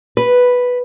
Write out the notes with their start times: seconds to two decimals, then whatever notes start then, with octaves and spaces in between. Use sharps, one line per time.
0.17 B4